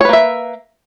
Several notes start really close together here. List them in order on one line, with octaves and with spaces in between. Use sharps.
C#5 B4 A#3 E5